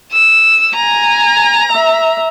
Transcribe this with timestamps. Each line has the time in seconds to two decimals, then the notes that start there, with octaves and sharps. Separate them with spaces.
0.12 E6
0.76 G#5 A#5
1.73 E5